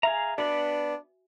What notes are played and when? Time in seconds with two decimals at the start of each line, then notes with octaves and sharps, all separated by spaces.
0.03 G#4 E5 F5 G#5 A#5
0.38 B3 D4 F#4 B4 D5